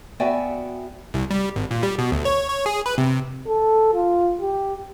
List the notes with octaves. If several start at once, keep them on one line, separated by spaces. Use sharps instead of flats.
B3 F#4 D5 E5 G5 G#5
C2
G3
G#1
A#2
G3
B2
D2
C#5
C#5
G#4
B4
C3
A4
F4
G4